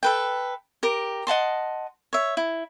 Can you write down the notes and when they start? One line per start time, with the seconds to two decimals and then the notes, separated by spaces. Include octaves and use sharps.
0.03 A4 B4 G5
0.83 G4 A#4
1.27 D#5 F#5 A5 C6
2.13 C#5 E5
2.37 E4